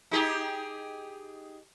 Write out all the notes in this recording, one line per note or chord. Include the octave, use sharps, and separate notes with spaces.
D#4 G4 G#4